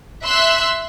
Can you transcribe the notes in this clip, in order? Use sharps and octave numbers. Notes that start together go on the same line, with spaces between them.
E5 C6 E6 F#6